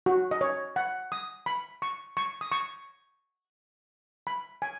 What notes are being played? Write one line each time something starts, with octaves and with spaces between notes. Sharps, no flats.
F#4
D#5
C#5
F#5
D#6
B5
C#6
C#6
D#6
C#6
B5
G#5